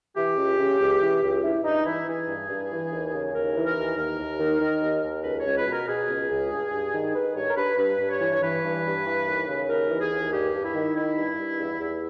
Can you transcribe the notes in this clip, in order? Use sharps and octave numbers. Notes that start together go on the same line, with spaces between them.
E3 G4
C#2
C#3
C#2
E3
C#2
G2 E4
G2 D#4
E3 E4
E3 G#4
G2
G2
E3
D#2
C#3
D#2 A#4
E3
A#4
D#2
D#2 A#4
D#2
D#3
D#3
D#2
D#2
C#2 B4
C#5
C#2
B4
B2
A#4
B2 G#4
C#2
C#2
G2
G2
D#3
D#3 B4
G2 C#5
A#4
G2 B4
G2 B4
G2
C#5
E3
C#5
E3 B4
G2
G2
E3
D#2
C#3
D#2 A#4
E3
G#4
D#2
G2 G4
G2
E4
D#3
D#3 E4
G2
G2
E2
E2